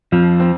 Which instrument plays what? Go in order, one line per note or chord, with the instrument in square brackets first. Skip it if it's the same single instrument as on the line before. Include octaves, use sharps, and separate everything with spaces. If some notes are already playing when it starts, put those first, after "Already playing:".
[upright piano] F2 [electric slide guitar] F3
[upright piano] C4